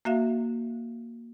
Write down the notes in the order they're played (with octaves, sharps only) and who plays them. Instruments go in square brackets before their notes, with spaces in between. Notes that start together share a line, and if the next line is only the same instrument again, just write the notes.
[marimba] A#3 F#4 E5 F5